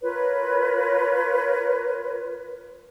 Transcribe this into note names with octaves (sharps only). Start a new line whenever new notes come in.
F4 A#4 B4 C#5